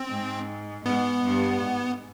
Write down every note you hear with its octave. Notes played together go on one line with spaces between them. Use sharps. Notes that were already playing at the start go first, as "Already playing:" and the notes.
Already playing: C4
G#2
G#2 B3
G2
G#2